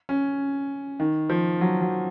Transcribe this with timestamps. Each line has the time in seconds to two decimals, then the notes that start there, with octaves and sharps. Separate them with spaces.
0.09 C#4
1.00 D#3
1.30 F3
1.61 F#3
1.81 F#3